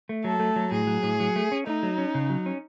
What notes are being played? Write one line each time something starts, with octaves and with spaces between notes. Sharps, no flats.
A3
F#3 A4
A3
F#3
A2 G#4
F#3
A2
F#3
A3
C#4
A3 D#4
F#3
C#4
C#3
F#3
C#4